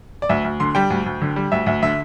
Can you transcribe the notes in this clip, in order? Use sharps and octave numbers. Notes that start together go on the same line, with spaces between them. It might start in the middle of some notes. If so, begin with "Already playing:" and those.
D5
D2 E5
D2
D3 C6
G3 G5
D2
D2
D3
G3
D2 E5
D2 E5
D3 E5